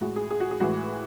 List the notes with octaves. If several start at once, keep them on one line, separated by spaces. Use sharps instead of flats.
A2 G#3 F#4
G#4
G#4
F#4
G#4
A2 E3 G#3 F#4